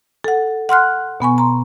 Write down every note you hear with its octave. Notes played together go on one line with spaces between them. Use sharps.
A4 F#5
F#5 C6 F6 F#6
B2 B3 G#5 C#6
A#5 C6